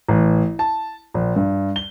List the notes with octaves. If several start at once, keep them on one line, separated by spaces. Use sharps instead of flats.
A1
A5
A#1
G2
G7